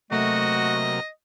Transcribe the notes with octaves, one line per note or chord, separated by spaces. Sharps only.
C3 F#3 A3 A#3 F#4 D#5